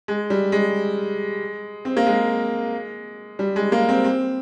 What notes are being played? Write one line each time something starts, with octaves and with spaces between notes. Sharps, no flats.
G#3
G3
G#3
C4
A#3
G#3
G3
G#3
A#3
C4
C4